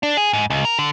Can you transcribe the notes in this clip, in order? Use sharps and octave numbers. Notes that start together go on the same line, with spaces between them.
D4
G#4
G#2
C#2
A#4
D3